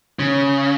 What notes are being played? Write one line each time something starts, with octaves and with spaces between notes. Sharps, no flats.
C#3